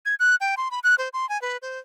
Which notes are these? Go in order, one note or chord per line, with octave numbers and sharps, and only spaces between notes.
G#6
F#6
G5
C6
B5
F#6
C5
C6
G#5
B4
C5